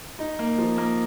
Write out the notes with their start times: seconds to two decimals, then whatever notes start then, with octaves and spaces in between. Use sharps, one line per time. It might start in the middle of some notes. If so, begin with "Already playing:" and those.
0.19 D#4
0.39 A#3
0.58 F3
0.78 A#3